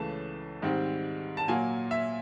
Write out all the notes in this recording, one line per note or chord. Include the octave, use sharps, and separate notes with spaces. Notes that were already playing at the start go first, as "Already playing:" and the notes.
Already playing: C#2 C#3 E3 A3 A5
G#2 D#3 G3 C4
A5
A#2 F#3 A#3 G#5
E5